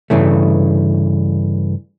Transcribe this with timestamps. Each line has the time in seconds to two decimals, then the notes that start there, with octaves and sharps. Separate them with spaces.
0.10 G2 C#3 E3 A3